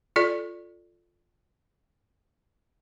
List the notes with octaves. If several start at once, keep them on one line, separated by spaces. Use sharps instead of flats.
F4 A4 D5